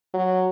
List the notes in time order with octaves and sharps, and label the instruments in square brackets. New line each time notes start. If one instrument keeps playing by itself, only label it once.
[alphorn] F#3